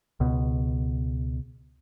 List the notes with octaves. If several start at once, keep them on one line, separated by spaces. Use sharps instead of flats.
C#2 B2